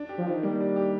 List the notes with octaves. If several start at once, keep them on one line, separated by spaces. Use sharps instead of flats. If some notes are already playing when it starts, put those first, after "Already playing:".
Already playing: D4
G4
F3
D#3
G3 A#3
D4
G4